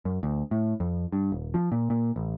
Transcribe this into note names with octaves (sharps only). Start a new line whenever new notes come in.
F#2
D2
A2
F2
G2
D#1
F3
A#2
A#2
A1